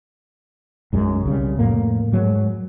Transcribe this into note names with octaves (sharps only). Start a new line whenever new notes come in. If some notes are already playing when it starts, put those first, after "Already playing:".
B1 F#2 G#3
C2 C#3 G3
F2 A2 A#3
G#2 F#3 G#3